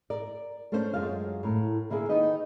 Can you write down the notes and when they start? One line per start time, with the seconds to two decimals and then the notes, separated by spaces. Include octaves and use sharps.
0.10 A#4 D5
0.72 A3 A#3 C#4 D4 C5
0.94 F#2 G#3 F4 F5
1.43 A2 A#4
1.90 D3 A#3 E4 G#4
2.09 D#3 D#4 B4 D#5